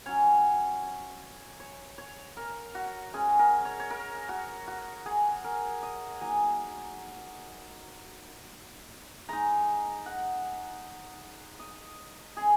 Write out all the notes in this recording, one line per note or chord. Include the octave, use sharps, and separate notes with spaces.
F#3 C#4 C#5
C#5
C#5
A#4
F#4
G#3 C#4 G#4
A#4
C#5
C#5
A#4
F#4
F#4
G#4
A#4
D#5
F#3 A#3 D#4 G#5
G#3 D#4 A#5
F#5
D#5
G#3 C#4 G#4